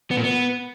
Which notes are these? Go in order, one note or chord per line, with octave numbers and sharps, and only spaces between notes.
B3
A#2
B3